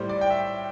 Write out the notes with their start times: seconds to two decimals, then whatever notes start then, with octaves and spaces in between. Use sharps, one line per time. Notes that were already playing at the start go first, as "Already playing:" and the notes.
Already playing: A2 G3 C5
0.09 D5
0.21 G5
0.30 E5